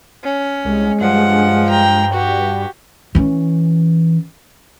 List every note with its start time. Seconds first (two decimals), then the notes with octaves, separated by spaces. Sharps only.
0.24 C#4
0.65 C2 G#3
1.01 G2 F3 F#5
1.70 G5 A#5
2.13 F#4 G4
3.15 E3 C#4